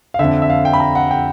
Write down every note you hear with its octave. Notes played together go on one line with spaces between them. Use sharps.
F5
F2 D3 E5
E5
F5
G5
B5
A#5
F#5
G5